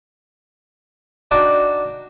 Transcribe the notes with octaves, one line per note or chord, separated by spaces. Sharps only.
D4 D#4 F#4 D5 G5